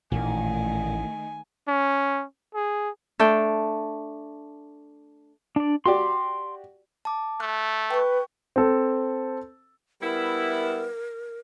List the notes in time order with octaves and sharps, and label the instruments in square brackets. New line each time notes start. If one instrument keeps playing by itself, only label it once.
[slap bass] A1 [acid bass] A#2 [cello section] D#3 A3 [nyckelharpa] G#5
[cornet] C#4
G#4
[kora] A3 D4 G5
[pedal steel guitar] D4 D5
[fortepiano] F#4 G4 D5 [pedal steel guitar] C6 D6
[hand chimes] A5 D6
[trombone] A3 [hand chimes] F#6
[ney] B4 [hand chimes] G5 C#6
[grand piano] C4 A4
[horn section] G3 B3 E4 [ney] A#4